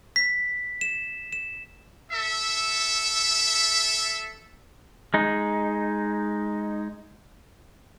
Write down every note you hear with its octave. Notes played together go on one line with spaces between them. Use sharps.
B6
E7
E7
A4 E5
G#3 D#4